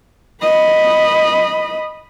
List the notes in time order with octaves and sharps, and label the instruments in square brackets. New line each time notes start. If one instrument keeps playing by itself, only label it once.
[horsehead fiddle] D#5 B5